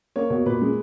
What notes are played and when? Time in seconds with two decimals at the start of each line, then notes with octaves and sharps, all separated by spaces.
0.16 A#3 C#5
0.30 B2 C#5
0.46 A#2 B4
0.62 G#3